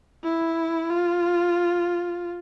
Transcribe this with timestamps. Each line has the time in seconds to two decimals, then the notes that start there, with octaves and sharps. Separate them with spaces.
0.24 E4
0.90 F4